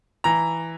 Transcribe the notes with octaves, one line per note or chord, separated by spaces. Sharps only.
E3 A#5